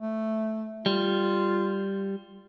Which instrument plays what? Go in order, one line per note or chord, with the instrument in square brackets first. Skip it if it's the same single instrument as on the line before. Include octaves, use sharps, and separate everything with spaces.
[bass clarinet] A3
[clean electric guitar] G3 [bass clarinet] F4